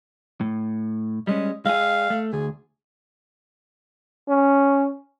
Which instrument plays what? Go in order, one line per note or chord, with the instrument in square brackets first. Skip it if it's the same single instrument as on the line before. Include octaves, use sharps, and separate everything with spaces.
[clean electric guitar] A2
[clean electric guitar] G3 G#3 C#4 [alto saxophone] D#5
[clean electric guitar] G#3 G#4 [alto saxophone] F5
[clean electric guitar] A3
[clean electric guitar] D2 [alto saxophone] G#4
[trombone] C#4